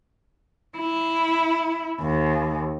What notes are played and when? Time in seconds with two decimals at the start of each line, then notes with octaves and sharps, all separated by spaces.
0.78 E4
2.01 D#2